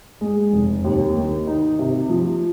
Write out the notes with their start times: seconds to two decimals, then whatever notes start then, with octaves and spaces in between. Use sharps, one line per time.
0.21 G#3
0.53 F1
0.85 D#2
1.15 D#3
1.47 D#4
1.79 C3
2.10 F3